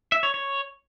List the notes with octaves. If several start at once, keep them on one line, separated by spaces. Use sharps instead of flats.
E5
C#5
C#5